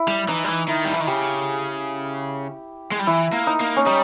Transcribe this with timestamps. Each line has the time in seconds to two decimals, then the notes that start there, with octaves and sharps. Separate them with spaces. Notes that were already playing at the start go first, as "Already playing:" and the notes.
Already playing: E4
0.08 G3
0.28 E3 D#4
0.44 G3
0.48 E3
0.68 D#3 E4
0.85 G3
0.93 E3
1.00 D#3
1.07 C#3 G4
2.91 G#3
2.99 G3
3.07 E3 E4
3.33 A#3
3.47 D#4
3.61 A#3
3.76 C#4
3.86 G3 D#4